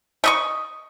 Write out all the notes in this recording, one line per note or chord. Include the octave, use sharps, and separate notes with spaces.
A3 D#5 C#6